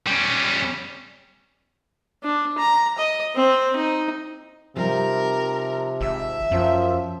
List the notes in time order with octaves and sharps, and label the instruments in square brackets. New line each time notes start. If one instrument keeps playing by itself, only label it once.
[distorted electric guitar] G3 C#4
[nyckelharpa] D4
A#5
D#5
C4
D#4
[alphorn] C3 [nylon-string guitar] F3 G3 D#4 [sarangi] A#4
[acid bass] G#1 [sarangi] E5
[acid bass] F#2 [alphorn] F3 [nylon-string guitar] C#4